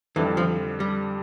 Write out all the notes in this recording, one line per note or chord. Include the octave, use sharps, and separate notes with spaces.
F2 D3 E3 G3
F3
G3